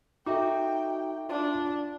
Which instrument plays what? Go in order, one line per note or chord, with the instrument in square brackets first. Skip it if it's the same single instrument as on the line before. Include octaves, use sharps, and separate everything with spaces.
[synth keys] D#4 F#4 [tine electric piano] A4 E5 D6 [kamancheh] G5
[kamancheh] D4 [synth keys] F4